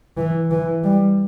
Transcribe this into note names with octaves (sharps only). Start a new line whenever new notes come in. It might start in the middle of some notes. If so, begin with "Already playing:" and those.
E3
E3
G3